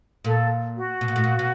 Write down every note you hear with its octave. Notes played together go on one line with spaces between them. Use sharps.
A#2 A4
F#4
B2
A#2
A2
A#2
B2